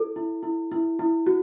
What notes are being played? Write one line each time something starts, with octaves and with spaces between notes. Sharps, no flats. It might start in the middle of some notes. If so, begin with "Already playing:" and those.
Already playing: E4 A4
E4
E4
E4
E4
F#4